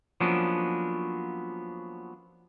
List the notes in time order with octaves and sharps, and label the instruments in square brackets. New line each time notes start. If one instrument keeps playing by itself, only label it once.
[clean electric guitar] F3 F#3 A#3 B3 C#4 D4